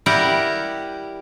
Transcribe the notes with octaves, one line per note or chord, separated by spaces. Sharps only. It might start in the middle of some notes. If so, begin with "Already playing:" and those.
G3 E4 G4 A#4 F#5 G5